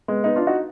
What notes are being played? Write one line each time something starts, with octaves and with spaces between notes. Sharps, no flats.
G#3 B3
B3 D#4
D4 F4
D#4 F#4